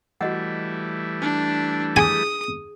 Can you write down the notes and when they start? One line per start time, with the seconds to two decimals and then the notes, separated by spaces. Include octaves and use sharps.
0.21 E3 G3 A3 F#4 D#5 F#5
1.22 D4
1.96 G#4 G#5 D#6